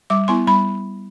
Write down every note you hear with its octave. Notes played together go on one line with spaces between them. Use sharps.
G3 D6
B3 E4 C6
G3 B5